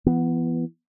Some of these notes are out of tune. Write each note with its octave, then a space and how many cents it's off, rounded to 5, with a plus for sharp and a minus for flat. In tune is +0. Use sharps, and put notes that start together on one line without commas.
E3 +35 B3 +0